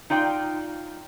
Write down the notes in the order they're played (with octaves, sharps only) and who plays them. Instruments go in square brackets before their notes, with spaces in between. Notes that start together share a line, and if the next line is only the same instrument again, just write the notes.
[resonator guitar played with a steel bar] D#4 F4 D5 G5